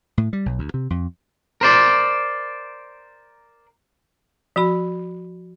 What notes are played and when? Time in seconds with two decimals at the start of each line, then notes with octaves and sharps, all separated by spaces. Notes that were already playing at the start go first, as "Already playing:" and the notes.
0.18 A2
0.33 G3
0.46 B1
0.59 D2
0.74 C3
0.90 F2
1.61 A#4 C5 D5
4.56 F3 F#4 B5